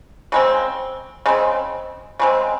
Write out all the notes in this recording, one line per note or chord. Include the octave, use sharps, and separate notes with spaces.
C#3 G#3 C4
C#3 G#3 C4
C#3 G#3 C4